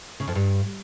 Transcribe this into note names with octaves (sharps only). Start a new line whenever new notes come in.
C#3
F2
G2